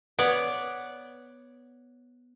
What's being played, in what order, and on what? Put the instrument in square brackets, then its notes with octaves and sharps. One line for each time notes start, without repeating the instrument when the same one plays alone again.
[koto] B3 C#5 D5